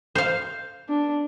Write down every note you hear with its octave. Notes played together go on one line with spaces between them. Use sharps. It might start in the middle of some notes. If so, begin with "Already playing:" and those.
C5 F5
D4